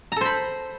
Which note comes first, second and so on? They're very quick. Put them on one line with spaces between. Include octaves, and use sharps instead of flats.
A#5 A4 C5 B5